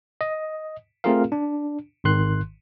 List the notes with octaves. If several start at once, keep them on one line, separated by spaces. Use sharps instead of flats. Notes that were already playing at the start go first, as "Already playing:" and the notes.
D#5
A3 C4 F4 G#4 A#4 F5
D4
G#1 G#2 D#3 C6 F#6